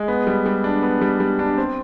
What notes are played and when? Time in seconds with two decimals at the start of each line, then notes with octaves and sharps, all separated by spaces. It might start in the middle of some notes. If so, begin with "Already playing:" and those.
Already playing: G#3
0.08 B3
0.27 G3
0.46 G3
0.64 D4
0.83 B3
1.01 G3
1.20 G3
1.39 D4
1.57 C4